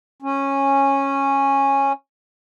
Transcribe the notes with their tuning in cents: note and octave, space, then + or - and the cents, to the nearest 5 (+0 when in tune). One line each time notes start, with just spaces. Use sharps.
C#4 -10